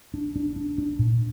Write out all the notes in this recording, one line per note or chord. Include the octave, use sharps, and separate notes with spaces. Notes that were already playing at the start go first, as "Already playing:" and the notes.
D4
D4
D4
D4
A#2